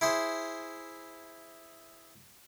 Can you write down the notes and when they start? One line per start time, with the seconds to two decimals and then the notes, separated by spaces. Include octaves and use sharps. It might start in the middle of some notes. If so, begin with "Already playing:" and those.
0.01 E4 G#4 C5